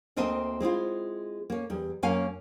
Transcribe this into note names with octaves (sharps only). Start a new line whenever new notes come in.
D2 A#3 C4 D#5 E5 A5
G#3 C4 E4 F4
A#3 C#4
E2 G3
F#2 A#3 C#4 F5 G#5